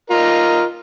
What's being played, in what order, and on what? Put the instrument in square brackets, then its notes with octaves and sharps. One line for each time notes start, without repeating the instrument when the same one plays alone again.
[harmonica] F4 A#4 D#5